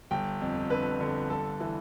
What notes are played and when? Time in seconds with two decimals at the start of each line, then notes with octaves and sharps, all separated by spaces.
0.11 G1 G5
0.41 F2
0.70 D3 B4
1.00 D3
1.30 G1 A4
1.60 E3